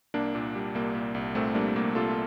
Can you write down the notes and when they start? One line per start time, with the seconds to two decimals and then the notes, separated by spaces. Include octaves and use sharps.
0.14 C2 A#3 D4
0.35 A#2
0.55 G3
0.75 C2 A#3
0.95 A#2
1.15 C2
1.35 A#2 A3 C4
1.55 G3 A#3 D4
1.75 C2 A#3
1.95 C2 F4 A4
2.10 F4